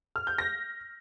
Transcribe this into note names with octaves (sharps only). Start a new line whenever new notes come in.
F6
G6
A#6